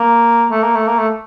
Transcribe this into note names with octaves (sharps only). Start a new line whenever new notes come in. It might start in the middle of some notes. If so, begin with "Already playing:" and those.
Already playing: A#3
A3
A#3
A3
A#3
A3